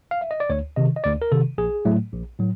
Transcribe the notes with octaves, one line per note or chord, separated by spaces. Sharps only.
F5
E5
D#5
D5
D2 C#5
C3 D#3 D#5
D#5
D2 D5
A#4
C3 D#3 A4
A#1 G#4
A2 F#3 A3
A#1
A2 F#3